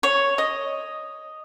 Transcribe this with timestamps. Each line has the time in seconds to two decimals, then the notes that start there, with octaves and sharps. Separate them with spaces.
0.03 C#5
0.38 D#5